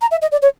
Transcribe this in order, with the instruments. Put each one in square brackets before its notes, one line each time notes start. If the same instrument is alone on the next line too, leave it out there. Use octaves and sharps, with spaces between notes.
[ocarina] A#5
E5
D#5
D5
C#5